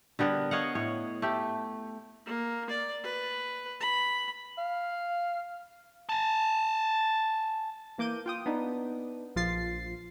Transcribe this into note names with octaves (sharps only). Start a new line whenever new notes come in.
D3 G3 B3 A#4
C#5 D#5 F5 F#5
A2 C#5
A3 G4
A#3
D5
B4
B5
F5
G#5 A5
E3 A#3 D6 G6 D#7
F4 G5 D#6
B3 D4 D#4
A#1 F3 F4 A6 C7